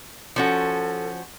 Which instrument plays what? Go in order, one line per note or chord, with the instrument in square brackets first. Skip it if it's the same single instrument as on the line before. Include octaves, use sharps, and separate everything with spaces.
[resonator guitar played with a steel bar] F3 C#4 F#4 [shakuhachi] A4